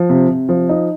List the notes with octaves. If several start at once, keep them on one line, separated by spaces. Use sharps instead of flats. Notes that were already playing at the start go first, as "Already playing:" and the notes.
Already playing: F3
C3
C3
F3
D#4